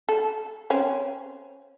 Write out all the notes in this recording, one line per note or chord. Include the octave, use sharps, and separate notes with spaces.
A4
C4 C#4